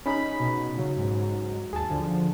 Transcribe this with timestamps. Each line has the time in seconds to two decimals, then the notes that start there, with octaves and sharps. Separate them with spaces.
0.06 C#4 D#4 G#4 B5
0.40 B2
0.78 C#3 F#3
0.97 G#2
1.73 D#2 G#4 A5
1.90 D3 F3